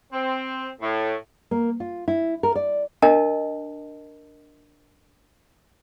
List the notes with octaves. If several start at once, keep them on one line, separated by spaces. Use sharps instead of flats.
C4
A2
A#3
F4
E4
A#4
D5
D4 A#4 D#5 A5